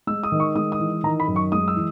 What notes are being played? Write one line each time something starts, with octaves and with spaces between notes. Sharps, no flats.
G#3 E6
D#6
D#3
C#6
G#3 D#6
D#6
E3
D#3 A#5
B5
F#2
C#6
G#3 D#6
E6
E3